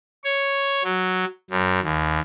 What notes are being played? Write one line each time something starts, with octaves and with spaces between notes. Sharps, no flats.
C#5
F#3
F#2
D#2